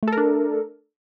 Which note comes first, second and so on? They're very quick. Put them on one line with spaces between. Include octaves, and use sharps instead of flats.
A3 A4 A#4 D4